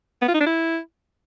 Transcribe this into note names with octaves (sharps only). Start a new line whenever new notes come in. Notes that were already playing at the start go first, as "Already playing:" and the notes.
B3
F4
D#4
D4
E4